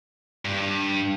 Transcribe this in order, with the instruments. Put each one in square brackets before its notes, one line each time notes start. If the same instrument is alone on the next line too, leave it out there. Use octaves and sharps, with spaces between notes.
[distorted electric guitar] G2